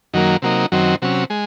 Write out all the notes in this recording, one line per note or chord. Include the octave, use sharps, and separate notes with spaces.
F#2 D#3 F#3 A#3
C3 F#3 A#3 D#4
F#2 D#3 F#3 C4
C3 F#3 C#4
G#3